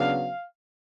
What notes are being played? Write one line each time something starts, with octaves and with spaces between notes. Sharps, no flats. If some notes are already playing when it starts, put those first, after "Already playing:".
Already playing: C#3 F#3 B3 D4 F5